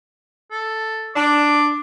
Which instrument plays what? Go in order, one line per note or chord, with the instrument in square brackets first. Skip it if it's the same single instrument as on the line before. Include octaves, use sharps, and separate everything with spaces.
[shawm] A4
[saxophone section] D4 [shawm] D6